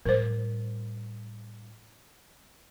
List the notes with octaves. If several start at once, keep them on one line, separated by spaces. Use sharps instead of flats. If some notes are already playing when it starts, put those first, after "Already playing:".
A2 G3 A#4 C5